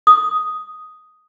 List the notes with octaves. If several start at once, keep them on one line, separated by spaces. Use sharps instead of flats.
D#6